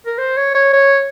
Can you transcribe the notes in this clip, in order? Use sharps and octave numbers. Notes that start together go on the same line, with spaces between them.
A#4
C5
C#5
C#5
C#5